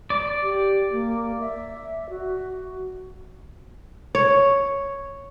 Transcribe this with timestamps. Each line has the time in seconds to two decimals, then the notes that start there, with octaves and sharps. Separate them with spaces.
0.10 D5
0.43 G4
0.92 A#3
1.40 E5
2.10 F#4
4.15 C#5